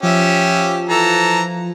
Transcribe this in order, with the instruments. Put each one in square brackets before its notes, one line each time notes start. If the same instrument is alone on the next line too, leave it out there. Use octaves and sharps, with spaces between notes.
[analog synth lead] F3 [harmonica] C#4 G4 E5
[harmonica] E3 A4 A#5